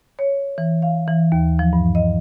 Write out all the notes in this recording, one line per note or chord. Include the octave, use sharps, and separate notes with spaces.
C#5
E3
F5
E3
D#2
F3
G2
D#5